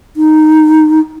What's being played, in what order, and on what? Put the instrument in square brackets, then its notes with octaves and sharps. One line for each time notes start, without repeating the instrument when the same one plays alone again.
[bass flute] D#4